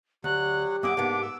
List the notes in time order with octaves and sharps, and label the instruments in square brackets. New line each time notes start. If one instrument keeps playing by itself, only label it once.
[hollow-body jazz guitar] D2 [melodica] F#3 F#5 [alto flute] G4 [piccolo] F#6
[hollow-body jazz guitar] F#2 A#3 F#5 [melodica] G#4 E5 [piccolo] D6
[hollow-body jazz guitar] G#2 A#3 B3 [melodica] D4
[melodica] D6 E6